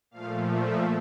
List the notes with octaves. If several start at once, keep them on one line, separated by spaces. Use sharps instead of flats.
A#2 F3 A3 F5
E5